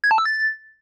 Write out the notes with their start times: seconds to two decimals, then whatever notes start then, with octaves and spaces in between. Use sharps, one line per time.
0.04 G#6
0.11 A5
0.18 E6
0.25 A6